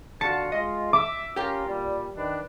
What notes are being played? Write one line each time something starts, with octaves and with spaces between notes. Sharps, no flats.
D3 F4 F#4 A5 C#7
G#3 F4 D#5
E5 D6
C#4 F4 G4 A#4 G5
A#2 G3
D#3 D4 B4